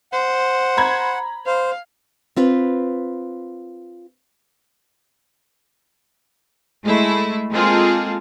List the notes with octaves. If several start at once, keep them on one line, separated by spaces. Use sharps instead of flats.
C5 F#5
A#5 B5 G#6
C5 F5
C4 F4 B4
G#3 A3 E4
G#3 A#3 C4 F4 G#4 A4